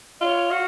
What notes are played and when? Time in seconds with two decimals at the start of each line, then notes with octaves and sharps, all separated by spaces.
0.20 F4 C#5 D#5
0.51 F#4 F5